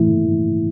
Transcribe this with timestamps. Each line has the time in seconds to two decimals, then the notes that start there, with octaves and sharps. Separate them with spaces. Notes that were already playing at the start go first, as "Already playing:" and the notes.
Already playing: A2 E3 A3 E4